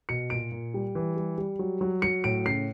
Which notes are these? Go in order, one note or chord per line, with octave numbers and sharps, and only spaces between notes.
B2 C#7
A#2 D7
A#2
G3
E3
G3
G3
F#3
F#3
F#3 C#7
A2 D7
C#3 C7